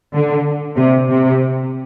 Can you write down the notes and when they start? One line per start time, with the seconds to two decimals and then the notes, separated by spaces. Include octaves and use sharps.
0.14 D3
0.77 C3
1.09 C3